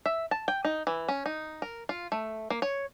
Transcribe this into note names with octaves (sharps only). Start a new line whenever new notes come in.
E5
A5
G5
D#4
E3
C#4
D#4
A#4
F4
A3
A#3
C#5